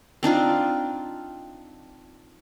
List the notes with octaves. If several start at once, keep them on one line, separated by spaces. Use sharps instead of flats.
C4 D4 D#4 F4